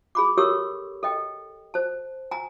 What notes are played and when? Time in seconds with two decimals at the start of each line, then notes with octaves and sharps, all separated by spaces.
0.15 G#4 B5 D6
0.38 G4 A4 A#4 C#5 C#6 E6
1.03 A4 D#5 G5
1.74 C5 A5
2.31 G#5 A#5